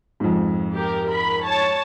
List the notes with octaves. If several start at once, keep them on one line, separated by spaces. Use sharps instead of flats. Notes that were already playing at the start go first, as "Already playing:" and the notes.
F2 G#2
G4 A#4
A#4 B5
C#5 A5